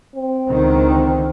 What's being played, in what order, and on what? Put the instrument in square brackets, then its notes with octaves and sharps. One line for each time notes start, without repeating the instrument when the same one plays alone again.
[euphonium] C4
[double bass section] C#2 D3 D#3